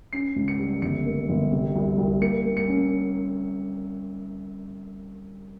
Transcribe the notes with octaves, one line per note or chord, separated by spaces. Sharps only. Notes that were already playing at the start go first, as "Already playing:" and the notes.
C#4 C7
C#2
C#7
G3
G1 C#7
A#3
G1
C3
C2
C2
A#3 C#7
A#3
C#7
C#4